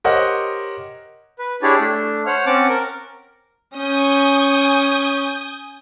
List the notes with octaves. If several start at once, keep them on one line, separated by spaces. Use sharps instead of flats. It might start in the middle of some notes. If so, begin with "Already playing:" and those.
G4 A#4 C5 C#5 D#5 F#5
B4
D4 E4 G4 G#4 C#5 D5
A3 D4
C5 C#5 F#5 F6
C4 C#4 F#5 A5 D6
A#4
C#4 G#5 D#6 G6